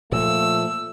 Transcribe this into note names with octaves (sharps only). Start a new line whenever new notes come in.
A#2 F3 A3 E6